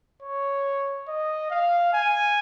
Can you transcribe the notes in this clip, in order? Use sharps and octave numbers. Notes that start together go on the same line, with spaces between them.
C#5
D#5
F5
G#5